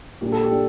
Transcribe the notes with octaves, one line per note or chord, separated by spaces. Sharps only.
A#2 G3 D4 G4
A4
G4
D4